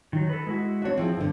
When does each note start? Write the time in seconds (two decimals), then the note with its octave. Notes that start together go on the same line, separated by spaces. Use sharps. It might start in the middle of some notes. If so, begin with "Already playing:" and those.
0.13 D#3 F#3
0.29 A4 B4
0.47 G#3 E4 F#4
0.82 C4 D4 F#4 C#5 E5
0.98 F3 C4 E4 G#4
1.17 G2 D3